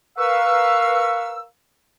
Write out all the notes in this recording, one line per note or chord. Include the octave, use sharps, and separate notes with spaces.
A#4 B4 F5 C#6 E6